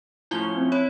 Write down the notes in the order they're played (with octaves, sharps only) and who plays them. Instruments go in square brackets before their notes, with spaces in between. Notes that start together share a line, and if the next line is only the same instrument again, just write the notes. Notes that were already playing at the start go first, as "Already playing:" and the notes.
[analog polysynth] A2 F3 C#4 [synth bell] E4 F4 G7
[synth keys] C4
[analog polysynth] E4 [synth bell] C#5